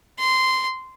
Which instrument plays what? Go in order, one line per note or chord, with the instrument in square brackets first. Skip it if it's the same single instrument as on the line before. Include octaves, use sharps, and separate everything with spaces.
[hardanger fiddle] C6